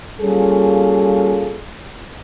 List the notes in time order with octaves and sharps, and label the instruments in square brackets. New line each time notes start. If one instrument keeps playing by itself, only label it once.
[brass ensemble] G3 A#3 C#4 F4 G#4 A4